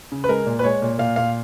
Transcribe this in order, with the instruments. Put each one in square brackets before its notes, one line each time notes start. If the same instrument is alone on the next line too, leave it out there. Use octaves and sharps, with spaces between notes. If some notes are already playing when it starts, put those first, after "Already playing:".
[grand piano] C#3
B4
G#3 A#4
A#2
B4
G#3 C#5
A#2
A#2 F5
A#2 F5